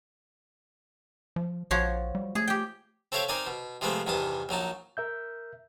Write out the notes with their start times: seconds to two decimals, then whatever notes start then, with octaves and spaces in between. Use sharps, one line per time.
1.36 F3
1.71 A#1 F3 F#4 C#5
2.15 G3
2.35 A3 G#4
2.47 G4 G5
3.12 C4 A4 C#5 E5 F5 G5
3.29 C4 D#4 A#4 D5 G#5
3.47 B2
3.81 C3 F3 G#3 A3 B3 C4
4.06 E2 G2 C3 D#3 A5 D#6
4.49 A#1 F#3 D#4 A5
4.97 A#4 E5 G6